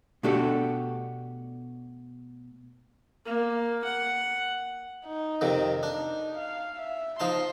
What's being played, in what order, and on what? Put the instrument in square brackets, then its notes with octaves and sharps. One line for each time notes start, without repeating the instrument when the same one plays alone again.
[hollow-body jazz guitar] B2 A3 D4 F#4 G4 A4
[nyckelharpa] A#3
F#5
[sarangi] D#4
[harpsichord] F2 C3 D#3
[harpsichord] D4 [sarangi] D#4
[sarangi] F5
E5
[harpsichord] F3 D#4 A5 [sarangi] C6